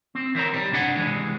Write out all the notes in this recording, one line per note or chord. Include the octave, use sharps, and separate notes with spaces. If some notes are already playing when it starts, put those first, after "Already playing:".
C4
E3 C4 A#4 C#5 A#5
B1 G3
C2 G2 D4 E4 F#5 G#5
C2 F#2 E3 G#3